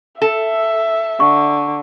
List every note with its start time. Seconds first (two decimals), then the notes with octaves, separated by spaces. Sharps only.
0.22 A4 E5
1.20 D3 C#6